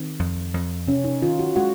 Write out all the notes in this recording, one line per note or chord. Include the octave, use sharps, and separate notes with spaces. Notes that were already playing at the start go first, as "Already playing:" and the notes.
Already playing: D#3 C4
F2
F2
C3 C#4
D#4
D#3 F4
F#4
G#3 F#4